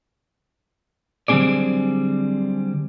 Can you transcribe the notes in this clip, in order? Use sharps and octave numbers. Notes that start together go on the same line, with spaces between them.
D3 F#3 G3 C4 G#4 D5